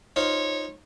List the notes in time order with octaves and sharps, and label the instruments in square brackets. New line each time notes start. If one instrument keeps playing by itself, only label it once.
[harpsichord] D#4 F4 C5 [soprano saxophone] C#5